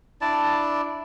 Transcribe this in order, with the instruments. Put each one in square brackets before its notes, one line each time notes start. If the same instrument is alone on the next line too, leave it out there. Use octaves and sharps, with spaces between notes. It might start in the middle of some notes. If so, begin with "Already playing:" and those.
[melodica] D4 E4 D5 A5